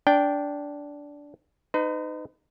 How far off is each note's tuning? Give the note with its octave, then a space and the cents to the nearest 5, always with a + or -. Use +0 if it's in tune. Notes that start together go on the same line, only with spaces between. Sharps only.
D4 -15 G5 +0
D#4 -15 B4 +40